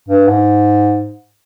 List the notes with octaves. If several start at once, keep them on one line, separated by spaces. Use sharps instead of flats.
G2
G#2